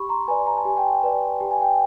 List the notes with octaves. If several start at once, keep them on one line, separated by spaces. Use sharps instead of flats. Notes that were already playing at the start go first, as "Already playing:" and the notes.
Already playing: G4 B5 C#6
A#5 C6
B4 D5 G#5 A#5
A#5
A5
G4 G#5
G5 A5
B4 D5
G4 A5
G#5
G5